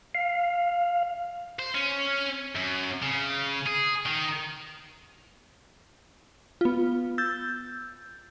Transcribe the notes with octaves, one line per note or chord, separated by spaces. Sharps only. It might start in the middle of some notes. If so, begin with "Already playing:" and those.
F5
C5
C#4
F#2
C#3
G#4
D#3
B3 F4
E6 G6 A6